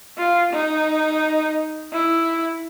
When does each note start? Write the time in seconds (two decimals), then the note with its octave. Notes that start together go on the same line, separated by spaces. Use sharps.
0.18 F4
0.53 D#4
1.92 E4